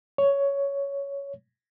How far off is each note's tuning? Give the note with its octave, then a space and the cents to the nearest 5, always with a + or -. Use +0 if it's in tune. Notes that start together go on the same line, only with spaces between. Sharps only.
C#5 +10